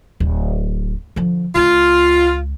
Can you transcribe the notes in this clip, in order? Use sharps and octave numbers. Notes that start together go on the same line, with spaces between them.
D1
D3 F3
C#2 F4